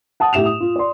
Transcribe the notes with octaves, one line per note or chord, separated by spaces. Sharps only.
F#5 A5 D#6
A2 G4 E5 E7 F7
D#6
F4
D5 C6